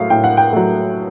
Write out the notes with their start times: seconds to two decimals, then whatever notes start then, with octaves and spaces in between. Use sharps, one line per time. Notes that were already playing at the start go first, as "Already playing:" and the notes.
Already playing: A2 F#3 A3 F5
0.10 A2 G5
0.24 F#5
0.37 G5
0.53 F#3 A3